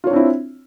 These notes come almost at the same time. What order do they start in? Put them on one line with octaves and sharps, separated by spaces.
F4 C#5 D4 C4 E4